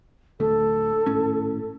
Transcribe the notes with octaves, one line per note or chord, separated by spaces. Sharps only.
D1 D2 A3 A4
G#1 A2 C#4